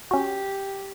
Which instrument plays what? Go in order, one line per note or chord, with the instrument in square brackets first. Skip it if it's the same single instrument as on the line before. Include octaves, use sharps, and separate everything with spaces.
[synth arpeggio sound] C#4 F#4 [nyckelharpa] G4